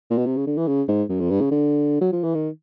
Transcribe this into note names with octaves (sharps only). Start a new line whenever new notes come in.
A#2
B2
C3
C#3
D3
E3
C#3
G#2
F#2
F2
G2
C#3
D3
F#3
F3
E3
D#3